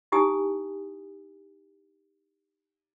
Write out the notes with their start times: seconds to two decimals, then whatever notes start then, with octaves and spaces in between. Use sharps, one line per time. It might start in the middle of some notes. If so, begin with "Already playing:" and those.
0.12 D#4 E4 G4 G#5 D#6